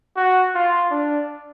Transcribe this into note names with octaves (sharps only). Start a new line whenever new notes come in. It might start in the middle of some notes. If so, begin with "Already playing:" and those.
F#4
F4
D4